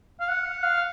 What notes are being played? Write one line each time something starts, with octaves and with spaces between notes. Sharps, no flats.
F5
F#5
F5